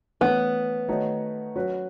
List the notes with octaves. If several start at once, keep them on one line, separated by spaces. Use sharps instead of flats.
E3 A3 B3 C#4
D#3 A3 D#4 F#4 C#5
F#3 C#4 F#4 B4